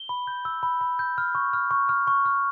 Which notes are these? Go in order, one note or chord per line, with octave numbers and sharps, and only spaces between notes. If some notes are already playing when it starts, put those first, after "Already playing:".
Already playing: G7
B5
G6
E6
B5
B5
G6
F6
C#6
F6
C#6
F6
C#6
F6